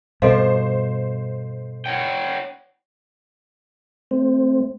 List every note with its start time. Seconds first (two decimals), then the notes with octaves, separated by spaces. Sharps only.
0.22 G2 B2 A4 C5 D#5 F5
1.86 C#5 F#5 G5
4.11 A3 C4 C5